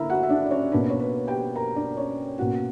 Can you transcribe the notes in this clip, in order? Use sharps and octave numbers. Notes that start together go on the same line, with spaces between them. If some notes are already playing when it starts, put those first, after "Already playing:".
Already playing: D3 A#3 E4 A#4 E5 A#5
F#4 F#5
E5
D4 D5
D5
C#4 C#5
B2 A#3 D4 B4
C#5
B4
G4 G5
A#4 A#5
D4 D5
C#4 C#5
B2 A#3 C#4 F#4 F#5